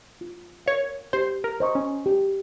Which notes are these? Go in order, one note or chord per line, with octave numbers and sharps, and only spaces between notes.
F4
A#4 C#5 F5
G4 C5
A#4
C5 D#5 A#5 C#6
C#4
G4